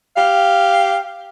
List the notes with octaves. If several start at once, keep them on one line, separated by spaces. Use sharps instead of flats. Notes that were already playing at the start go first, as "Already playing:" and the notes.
G4 F5